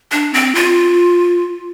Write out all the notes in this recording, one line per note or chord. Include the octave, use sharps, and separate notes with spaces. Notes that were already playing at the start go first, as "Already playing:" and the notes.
D4
C4
F4